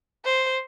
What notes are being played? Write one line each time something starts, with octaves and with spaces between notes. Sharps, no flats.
C5